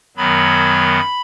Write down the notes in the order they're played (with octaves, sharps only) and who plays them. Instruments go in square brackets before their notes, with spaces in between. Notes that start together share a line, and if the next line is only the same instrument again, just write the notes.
[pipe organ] F#2 D#3 F#3 B3 B5